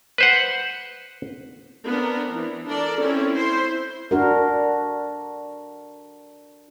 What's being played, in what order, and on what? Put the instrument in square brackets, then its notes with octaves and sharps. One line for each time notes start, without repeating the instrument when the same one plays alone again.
[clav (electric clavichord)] B4 C5 F#5
[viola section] B3 C4 D4 A#4
E3
D4 A4 A#4 D5
C4 C#4 E4 A4
E4 C5 C6
[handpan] D4 F#4 A#4